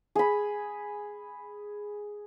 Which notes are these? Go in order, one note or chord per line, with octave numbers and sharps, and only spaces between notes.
G#4 B5